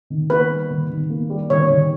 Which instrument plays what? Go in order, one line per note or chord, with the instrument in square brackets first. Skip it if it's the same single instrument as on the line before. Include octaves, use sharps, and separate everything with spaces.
[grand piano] D#3
[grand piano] A#3 [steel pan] B4
[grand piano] G3
D#3
D#3
A#3
G3
[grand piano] D#3 [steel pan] C#5
[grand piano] D#3